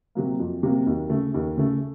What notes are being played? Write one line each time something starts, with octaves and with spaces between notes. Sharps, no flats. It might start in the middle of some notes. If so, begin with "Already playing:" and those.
C3 F#3 A#3
F2
C3 F#3 A#3
D#2
C#3 A3
D#2
C#3 A3